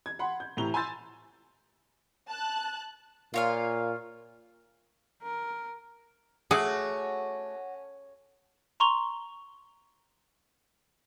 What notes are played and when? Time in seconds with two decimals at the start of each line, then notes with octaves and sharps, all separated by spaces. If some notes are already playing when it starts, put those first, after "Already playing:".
0.06 G#6
0.19 F#5 B5 C6
0.40 G6
0.57 A2 C3 E3 A#5 F7 G7
0.74 G#5 B5 C6 E6 G6 A6
2.29 A5 F#6
3.34 A#2 F4 C#5 F5
5.23 A#4
6.51 A3 C#4 F#4 G#4 D6
8.80 A#5 C6 C#6 F7 G7